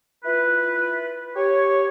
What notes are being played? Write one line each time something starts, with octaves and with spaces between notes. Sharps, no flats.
E4 F4 B4
G4 C#5